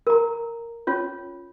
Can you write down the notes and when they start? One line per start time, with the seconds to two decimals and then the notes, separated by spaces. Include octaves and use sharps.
0.07 A#4 A#5
0.87 C#4 F4 C#5